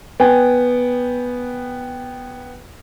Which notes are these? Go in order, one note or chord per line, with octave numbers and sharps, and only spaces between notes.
B3 G5 G#5